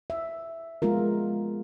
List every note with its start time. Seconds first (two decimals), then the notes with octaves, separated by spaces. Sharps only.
0.10 E5
0.82 G#3 B3 F4 A#4